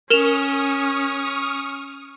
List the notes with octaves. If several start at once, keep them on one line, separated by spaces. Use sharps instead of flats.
C#4 A#4 C#6 D#6 F6 E7 F7